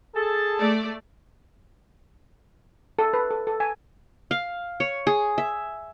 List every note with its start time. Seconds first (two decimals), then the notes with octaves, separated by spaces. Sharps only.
0.15 G#4 A4 A5
0.59 A3 D5
2.99 A4
3.13 B4
3.30 A4
3.47 A4
3.60 G#5
4.31 F5
4.80 C#5
5.07 G#4
5.38 E5